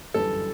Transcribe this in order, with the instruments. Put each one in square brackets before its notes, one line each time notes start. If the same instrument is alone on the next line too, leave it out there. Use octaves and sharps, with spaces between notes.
[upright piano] G1 F#2 E3 G3 D4 [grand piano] A4